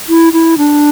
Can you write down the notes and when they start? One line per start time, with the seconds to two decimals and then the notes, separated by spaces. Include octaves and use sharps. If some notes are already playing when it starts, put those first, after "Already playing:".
0.09 E4
0.33 E4
0.58 D4